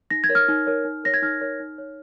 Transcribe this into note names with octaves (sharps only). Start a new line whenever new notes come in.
D#4 A#6
G#6
A#4 C#5
F6
D#4
A#4 C#5
D#4
A#4 C#5 A#6
G#6
D#4 F6
A#4 C#5
D#4
C#5